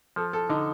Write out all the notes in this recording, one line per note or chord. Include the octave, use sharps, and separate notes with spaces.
F3 A4
A4
D3 D#4